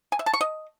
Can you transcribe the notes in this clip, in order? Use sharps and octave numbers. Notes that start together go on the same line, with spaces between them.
G#5
E5
A5
C#6
D#5